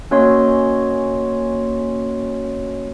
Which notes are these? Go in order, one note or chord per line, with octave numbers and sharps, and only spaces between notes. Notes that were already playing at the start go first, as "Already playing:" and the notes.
A#3 C#4 F#4 C#5 D#5 C6